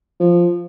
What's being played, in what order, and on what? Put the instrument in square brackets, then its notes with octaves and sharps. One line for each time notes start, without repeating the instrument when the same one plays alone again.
[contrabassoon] F3